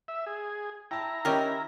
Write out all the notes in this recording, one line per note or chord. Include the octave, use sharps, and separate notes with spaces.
E5
G#4
E4 G5 A5 A#5
D#3 C#4 D#4 G4 A#4